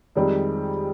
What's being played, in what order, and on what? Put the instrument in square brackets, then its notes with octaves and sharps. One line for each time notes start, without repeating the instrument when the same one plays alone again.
[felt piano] F2 D#3 G#3 C4 [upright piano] G3